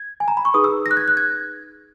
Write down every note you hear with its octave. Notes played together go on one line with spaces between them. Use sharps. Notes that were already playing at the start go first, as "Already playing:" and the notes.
Already playing: G#6
G#5
A#5
B5
C#6
D#4 G#4 B4 D#6
E6
A#6
F#6
G#6
F#6
G#6